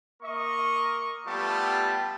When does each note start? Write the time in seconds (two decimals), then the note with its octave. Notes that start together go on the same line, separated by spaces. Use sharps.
0.23 A#3 A#4 D#5 C#6
1.27 G3 A3 B3 F4 G4 A5